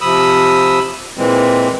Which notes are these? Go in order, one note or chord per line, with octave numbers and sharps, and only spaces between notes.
C3 F3 B5 D#6 E6
A#2 E3 G#3 C4